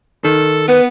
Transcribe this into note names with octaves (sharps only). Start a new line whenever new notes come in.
D#3 A4
B3 B4